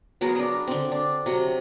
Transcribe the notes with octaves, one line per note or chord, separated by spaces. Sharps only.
F#3 B3 G#4 A#4
D4 A#4
D3 C4
D4
C3 F#3